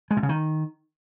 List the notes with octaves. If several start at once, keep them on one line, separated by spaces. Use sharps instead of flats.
G#3
B2
C#3
D#3